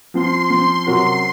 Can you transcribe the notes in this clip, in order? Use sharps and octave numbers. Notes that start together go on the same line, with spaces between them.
F3 C4 F4 C6
F3 C4 F4
C3 F#3 C#4 F#4 A#4 C6